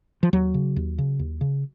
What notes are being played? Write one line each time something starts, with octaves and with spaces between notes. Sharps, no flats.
F3
D#2 F#3
C#3
D#2
C#3
D#2
C#3